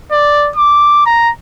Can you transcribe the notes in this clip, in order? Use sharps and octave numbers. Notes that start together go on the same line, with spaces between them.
D5
D6
A#5